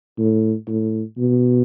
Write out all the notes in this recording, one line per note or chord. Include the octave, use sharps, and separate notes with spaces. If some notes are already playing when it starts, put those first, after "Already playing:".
A2
A2
B2